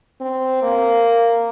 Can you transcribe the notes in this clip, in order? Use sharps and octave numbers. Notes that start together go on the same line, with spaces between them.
C4
A#3